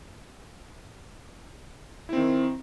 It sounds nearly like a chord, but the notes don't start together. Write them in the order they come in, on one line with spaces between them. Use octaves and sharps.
E4 C4 D#3